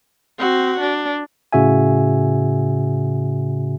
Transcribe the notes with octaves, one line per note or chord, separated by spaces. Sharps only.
C4 F#4
D4
A2 C#3 F#4 E5 G#5